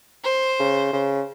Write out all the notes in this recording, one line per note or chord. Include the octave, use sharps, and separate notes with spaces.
C5
C#3
C#3